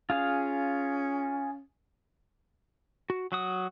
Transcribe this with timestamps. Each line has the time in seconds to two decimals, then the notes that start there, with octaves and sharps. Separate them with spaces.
0.10 C#4 F4 G#4 F5
3.10 F#4
3.32 F#3 F#4 D#6